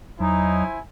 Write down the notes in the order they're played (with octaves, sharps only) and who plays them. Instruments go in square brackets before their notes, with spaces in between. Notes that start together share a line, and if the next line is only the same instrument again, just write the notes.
[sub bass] E2 [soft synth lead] F#3 [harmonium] D#4 [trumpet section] E4 C5 G#5